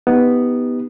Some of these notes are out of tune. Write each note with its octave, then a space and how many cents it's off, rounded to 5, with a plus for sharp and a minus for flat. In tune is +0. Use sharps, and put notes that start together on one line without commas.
B3 +0 D#4 +25 G4 +0